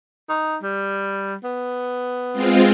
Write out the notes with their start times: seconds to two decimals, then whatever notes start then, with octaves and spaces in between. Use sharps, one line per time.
0.29 D#4
0.63 G3
1.44 B3
2.33 G#3 C4 F4